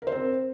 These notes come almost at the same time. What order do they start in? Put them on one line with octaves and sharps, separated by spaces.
A#4 C5 C4